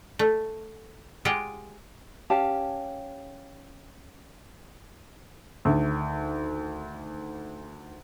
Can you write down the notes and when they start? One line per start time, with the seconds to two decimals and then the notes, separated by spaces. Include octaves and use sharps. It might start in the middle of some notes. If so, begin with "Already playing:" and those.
0.19 A3
1.25 G#3 F4 G4 F#5 G5
2.30 C#4 G4 F5 A5
5.65 D2 D#3